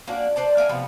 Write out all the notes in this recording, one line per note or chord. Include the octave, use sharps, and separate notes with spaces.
A#3 C#4 D4 F#4
B4 C5 D5 A5
A#3 A#4 E5 G#5
A2 C3 F3 B3